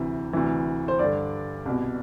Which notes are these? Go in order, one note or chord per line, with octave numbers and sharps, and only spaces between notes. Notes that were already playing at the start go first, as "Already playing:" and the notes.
Already playing: D2 C3 E3
D2 C3 E3
C5
G2 D3 D5
C2 B2